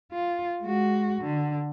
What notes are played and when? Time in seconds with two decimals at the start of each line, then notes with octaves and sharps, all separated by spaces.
0.12 F4
0.62 G#3 F#4
1.21 D3